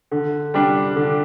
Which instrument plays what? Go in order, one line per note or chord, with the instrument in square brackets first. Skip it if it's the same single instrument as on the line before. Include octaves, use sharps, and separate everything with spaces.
[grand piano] D3
G3 D4
D3